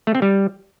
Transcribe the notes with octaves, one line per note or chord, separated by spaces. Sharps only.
A3
C4
G3